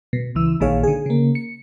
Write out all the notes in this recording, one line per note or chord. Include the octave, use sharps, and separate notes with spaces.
B2
C#2 E3 E6
A#1 A#2 D#3 G#4 C#5 F5
D3 G#4
C#3 A#3
C#7